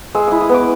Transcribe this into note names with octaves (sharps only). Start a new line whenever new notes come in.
G#3 E6
E4 D#6
D#6
B3 D6